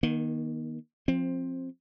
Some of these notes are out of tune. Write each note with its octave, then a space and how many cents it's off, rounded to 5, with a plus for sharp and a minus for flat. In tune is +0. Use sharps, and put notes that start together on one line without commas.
D#3 +0 A#3 +45
F3 +0 C4 +15